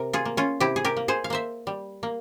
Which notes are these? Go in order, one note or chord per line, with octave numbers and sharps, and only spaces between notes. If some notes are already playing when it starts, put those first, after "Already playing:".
Already playing: C3 A#4
F4 G#4
A#3
C#4 F4
C3 E4 G4
G#4
G4 A#4
A#3
G#4 C5
F5
A#3 C5 E5
G3
A#3